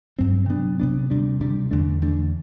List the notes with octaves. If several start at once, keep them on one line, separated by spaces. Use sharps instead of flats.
G2 F#3 C4
C3 F#3 B3 D4
C3 F#3 B3 D4
D2 C3 G3 D4
D2 C3 G3 D4
E2 D3 A3 D4
E2 D3 A3 D4